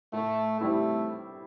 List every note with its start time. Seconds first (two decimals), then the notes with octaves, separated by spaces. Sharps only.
0.13 A2 A3
0.61 G3 A3 C4 E4